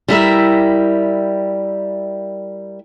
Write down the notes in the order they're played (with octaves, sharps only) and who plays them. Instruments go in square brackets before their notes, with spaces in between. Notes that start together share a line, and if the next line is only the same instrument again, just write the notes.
[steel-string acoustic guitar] G3 E4 A#4 E5